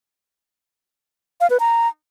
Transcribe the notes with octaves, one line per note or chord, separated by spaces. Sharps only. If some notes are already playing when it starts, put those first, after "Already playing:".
F5
B4
A#5